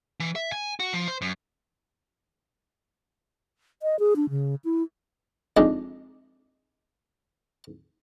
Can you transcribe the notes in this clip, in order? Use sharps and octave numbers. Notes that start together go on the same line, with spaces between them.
E3
E5
G#5
F#4
F3
C5
F#2
D#5
G#4
D4
C#3
E4
F2 G#3 D4 D#4